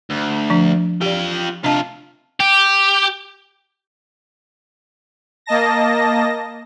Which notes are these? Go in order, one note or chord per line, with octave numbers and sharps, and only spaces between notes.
D2
F3 D4
F4 G4 D5 G5
C3 D4 F4 D#5 A5
G4
A#3 D#5 A5 A#6